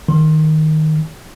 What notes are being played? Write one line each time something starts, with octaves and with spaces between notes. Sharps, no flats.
D#3